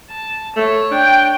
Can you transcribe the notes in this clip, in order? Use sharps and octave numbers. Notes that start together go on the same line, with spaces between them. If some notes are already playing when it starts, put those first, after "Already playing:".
A5
A3 C#5
D4 G5